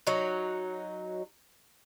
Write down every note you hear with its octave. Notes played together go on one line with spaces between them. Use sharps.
F#3 D#4